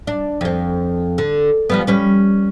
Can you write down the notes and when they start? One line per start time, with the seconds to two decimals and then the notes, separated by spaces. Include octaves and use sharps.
0.07 D4
0.41 F2 C4
1.18 D3
1.70 F3 G3 B3
1.87 G3 C#4 B4